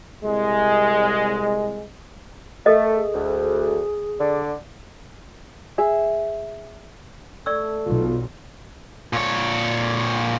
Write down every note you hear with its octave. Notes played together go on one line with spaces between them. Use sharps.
C2 G#3
A3 A4 A#4 D#5
G#4
D2
D3 D5
G#4 E5
A3 A4 D5 C#6 E6
B1 F4
A#2 C#5